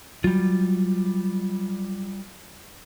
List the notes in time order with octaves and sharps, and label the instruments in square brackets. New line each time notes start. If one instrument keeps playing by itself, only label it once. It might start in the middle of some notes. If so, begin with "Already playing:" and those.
[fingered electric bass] F#3 [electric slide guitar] G3 F4